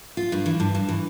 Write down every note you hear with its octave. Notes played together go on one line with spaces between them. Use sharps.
F4
G2
E3
G2
G2
E3